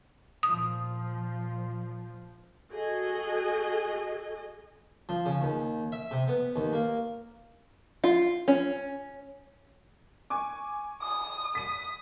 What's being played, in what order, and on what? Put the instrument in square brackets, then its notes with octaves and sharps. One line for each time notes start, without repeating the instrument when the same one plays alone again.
[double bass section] A#2 F3 [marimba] D#6
[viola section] F#4 G#4 A4 D#5 G#5
[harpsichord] F3
C#3
D#2
E5
C3
B3
D#2
A#3
[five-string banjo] F4
C#4
[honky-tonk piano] G#5 C#6 D6
[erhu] D#6
[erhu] D#6 [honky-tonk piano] B6 D#7